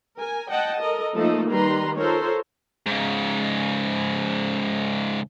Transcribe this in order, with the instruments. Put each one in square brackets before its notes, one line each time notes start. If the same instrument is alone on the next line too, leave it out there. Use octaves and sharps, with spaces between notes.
[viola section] A#4 G#5
D#5 F#5 G5 A5
A4 A#4 D#5
F3 A3 A#3 D#4 A4 D#5
D#3 G3 B4 A#5 C6
F4 A4 A#4 C5 C#5
[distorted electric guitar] G#2 C#3